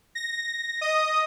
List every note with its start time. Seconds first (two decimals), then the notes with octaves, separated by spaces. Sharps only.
0.15 A#6
0.81 D#5 D#6